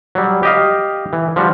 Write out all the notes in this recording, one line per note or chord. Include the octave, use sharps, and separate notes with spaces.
F#3 G3
G4 D#5 F5
E3
F3 G3 F#4